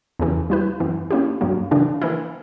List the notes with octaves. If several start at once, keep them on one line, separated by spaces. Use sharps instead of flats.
E2 C#3 E3
G3 A#3 E4 B4
F#2 E3 B3
A#3 C#4 E4 G4
G2 F#3 A#3
C#3 E3 A#3 D4
E3 A#3 E4